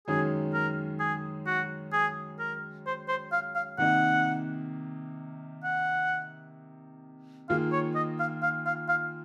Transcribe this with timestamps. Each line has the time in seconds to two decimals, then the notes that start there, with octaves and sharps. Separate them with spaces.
0.07 F#2 D#3 G#3 C#4 G#4
0.54 A#4
1.00 G#4
1.46 F#4
1.93 G#4
2.39 A#4
2.86 C5
3.08 C5
3.32 F5
3.55 F5
3.78 C3 D#3 A#3 D#4 F#5
5.64 F#5
7.49 D#3 A#3 F4 G#4 F5
7.72 C#5
7.95 D#5
8.19 F5
8.42 F5
8.66 F5
8.88 F5